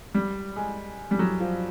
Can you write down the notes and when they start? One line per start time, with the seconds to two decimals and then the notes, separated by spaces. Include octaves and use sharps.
0.15 G3
0.56 G#3
1.11 G3
1.19 F#3
1.40 F3